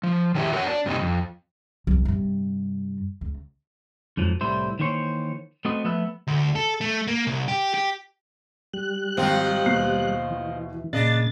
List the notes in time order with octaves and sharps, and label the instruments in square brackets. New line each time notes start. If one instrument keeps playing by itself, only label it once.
[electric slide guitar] F3
D#3 D4 E4 G4 E5
F#4 A#4 B4 C#5 F#5
D4
G2 C3 A3 D#4
F2
[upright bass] C2 F#3
G2 C3
C#2
[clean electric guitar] F2 G#2 F3 F#3
C2 A2 G3 E4 C5
D#3 E3 A#3 C5 C#5
A3 B3 C4 F#4 D#5
F3 A3 B3 B4 E5
[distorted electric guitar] D2
A4
A3
A#3
C2
G4
G4
[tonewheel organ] G3 F#6
[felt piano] G#1 G5 [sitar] D#3 F3 C4
[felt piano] D#2 B2 C7
[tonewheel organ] E3
[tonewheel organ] A#2 A6 [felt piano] C#3 [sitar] D4 D#5